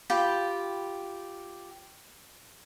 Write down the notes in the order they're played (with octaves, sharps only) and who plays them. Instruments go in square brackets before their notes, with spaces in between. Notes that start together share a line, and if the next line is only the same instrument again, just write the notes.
[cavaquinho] F4 G4 G5 B5